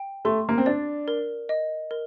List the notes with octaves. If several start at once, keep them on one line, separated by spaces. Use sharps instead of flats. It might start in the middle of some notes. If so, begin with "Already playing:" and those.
Already playing: G5
A3 C6
A#3
C4
D4 D5
A#4
D#5
A#4